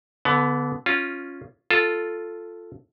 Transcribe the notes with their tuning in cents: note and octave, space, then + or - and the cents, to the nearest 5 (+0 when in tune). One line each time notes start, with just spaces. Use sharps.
D3 -25 B3 +10
C#4 +0 F4 +0
F4 +0 A4 +0